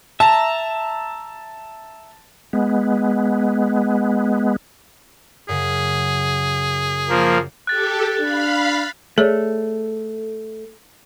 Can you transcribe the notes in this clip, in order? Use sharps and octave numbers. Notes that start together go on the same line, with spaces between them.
E5 A5 A#5
G#3 B3
F#2 C#3 G#4
F3 A#3
G4 A4 F#6 A6
D4 F5 B5
A3 G#4 C#5 D5